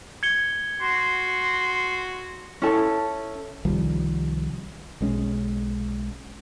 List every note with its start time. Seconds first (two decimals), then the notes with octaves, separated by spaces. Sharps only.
0.23 G#6 C#7 G7
0.81 F#4 C6
2.62 C#4 E4 A4 A5
3.65 C2 D#3 F3 G3
5.01 B1 G#3 C#4